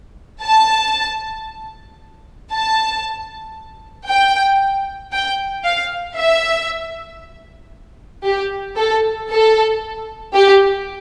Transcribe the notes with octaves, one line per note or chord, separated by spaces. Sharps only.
A5
A5
G5
G5
F5
E5
G4
A4
A4
G4